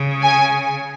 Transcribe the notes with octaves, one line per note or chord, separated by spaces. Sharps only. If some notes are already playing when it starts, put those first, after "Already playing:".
Already playing: C#3
G#5